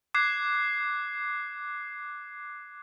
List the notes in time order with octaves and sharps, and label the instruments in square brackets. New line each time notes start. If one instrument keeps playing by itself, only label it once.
[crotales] D6 F#6 G#6 C7